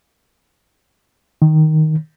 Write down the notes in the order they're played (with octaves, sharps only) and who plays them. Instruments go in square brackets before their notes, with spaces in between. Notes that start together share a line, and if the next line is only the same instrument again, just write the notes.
[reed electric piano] D#3